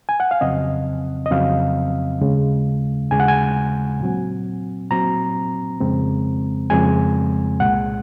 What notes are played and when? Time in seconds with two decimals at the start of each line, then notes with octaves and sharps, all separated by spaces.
0.09 G#5
0.20 F#5
0.31 F5
0.41 F2 C#3 F#3 C4 D#5
1.26 D#5
1.31 F2 C#3 F#3 C4 F5
2.21 D#2 C#3 G#3
3.11 D#2 C#3 G#3 G#5
3.20 F#5
3.28 G#5
4.00 A#2 F#3 C4
4.91 A#2 F#3 C4 A#5
5.80 F2 C#3 G#3 C4
6.70 F2 C#3 G#3 C4 G#5
7.60 C2 A#2 G#3 F#5